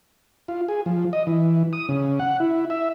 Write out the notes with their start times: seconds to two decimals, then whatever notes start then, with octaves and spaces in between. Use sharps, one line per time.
0.48 F4
0.68 G#4
0.86 F3
1.13 D#5
1.27 E3
1.73 D#6
1.89 C#3
2.20 F#5
2.40 E4
2.70 E5